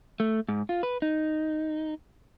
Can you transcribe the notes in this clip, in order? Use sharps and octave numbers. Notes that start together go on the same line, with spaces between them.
A3
G#2
F4
B4
D#4